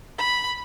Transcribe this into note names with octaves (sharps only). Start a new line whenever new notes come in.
B5